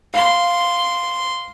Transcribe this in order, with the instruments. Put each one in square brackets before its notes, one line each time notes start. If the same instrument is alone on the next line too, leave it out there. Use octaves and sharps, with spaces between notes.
[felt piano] F5 [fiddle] C6